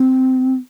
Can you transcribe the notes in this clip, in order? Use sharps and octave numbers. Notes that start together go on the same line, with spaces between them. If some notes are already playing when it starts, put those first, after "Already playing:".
Already playing: C4